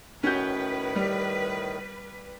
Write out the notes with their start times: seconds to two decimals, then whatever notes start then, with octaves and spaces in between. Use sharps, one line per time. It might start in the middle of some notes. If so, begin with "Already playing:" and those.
0.23 A2 D#3 C#4 F#4 B4 G6
0.95 G3